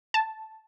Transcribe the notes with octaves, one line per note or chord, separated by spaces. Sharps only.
A5